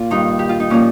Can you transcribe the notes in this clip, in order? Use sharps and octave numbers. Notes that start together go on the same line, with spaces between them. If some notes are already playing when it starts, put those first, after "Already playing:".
Already playing: A#2 F4
G2 D#3 D#4
G4
F4
D#4
A#2 F3 C#4